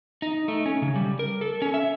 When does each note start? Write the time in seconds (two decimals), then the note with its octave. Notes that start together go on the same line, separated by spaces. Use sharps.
0.22 D#4
0.48 A3
0.66 C#4
0.82 C#3
0.96 G3
1.19 A#4
1.41 A4
1.62 C#4
1.74 E5